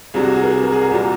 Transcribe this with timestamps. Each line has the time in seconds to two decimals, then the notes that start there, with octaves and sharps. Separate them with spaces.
0.14 C2 C3 F#3 G#4
0.23 F#4
0.34 G#4
0.43 A#4
0.63 A#4
0.72 G#4
0.82 A#4
0.91 C2 A#2 F#3